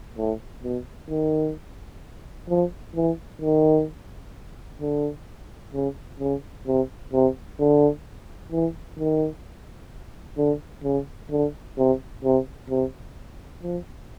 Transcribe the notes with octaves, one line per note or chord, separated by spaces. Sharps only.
A2
B2
D#3
F3
E3
D#3
D3
C#3
C#3
C3
C3
D3
E3
D#3
D3
C#3
D3
C3
C3
C3
F3